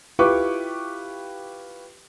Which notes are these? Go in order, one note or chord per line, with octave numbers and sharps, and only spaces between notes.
E4 F4 G4 B4 C#6 D6